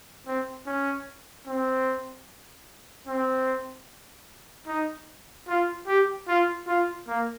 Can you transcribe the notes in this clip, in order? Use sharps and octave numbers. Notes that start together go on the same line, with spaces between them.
C4
C#4
C4
C4
D#4
F4
G4
F4
F4
A#3